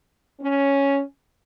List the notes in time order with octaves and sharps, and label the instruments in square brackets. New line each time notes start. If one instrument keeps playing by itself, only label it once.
[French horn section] C#4